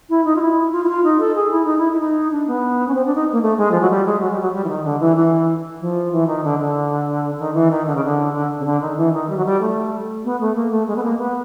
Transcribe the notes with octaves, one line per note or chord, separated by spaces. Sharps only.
E4
D#4
F4
E4
F4
E4
F4
D#4
A4
G#4
E4
D#4
E4
E4
D#4
D4
B3
C#4
C4
D4
D#4
A#3
A3
G#3
F3
F#3
G3
G#3
F#3
G3
F#3
G3
E3
D#3
D3
E3
E3
F3
E3
D#3
D3
D3
D#3
E3
D#3
D3
C#3
D3
D3
C#3
D3
D#3
E3
D#3
G3
F#3
G3
A3
B3
A3
A#3
A3
G#3
B3
A#3
B3